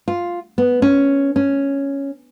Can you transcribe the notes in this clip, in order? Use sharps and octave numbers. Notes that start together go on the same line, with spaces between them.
F4
B3
C#4
C#4